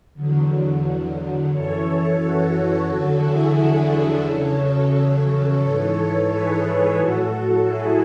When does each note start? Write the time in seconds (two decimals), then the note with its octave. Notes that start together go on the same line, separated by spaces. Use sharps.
0.13 E2 D3 F#3
1.49 F#2 E3 A4 C#5
2.18 F#4 A4
2.86 E2 D3 F#3 F#4 A4
3.21 E4 G#4
3.54 D4 F#4
3.88 F#4 A4
4.22 E2 C#3 F#3 A4 C#5
5.58 G#2 E3 A4 C#5
6.27 G#4 B4
6.94 A2 F#3 F#4 A4
7.63 E4 G#4